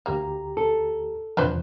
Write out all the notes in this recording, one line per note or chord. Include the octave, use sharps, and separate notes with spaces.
D2 A#3 G4 A#5
A4
E2 C3 F3 D4 B4 C5